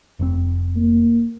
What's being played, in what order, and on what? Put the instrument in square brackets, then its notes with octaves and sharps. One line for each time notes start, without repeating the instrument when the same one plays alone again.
[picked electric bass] F1 G#2 C4
[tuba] A#3